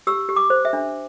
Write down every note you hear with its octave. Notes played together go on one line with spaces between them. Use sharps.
G4 E6
G4
D6
C5
E5
D4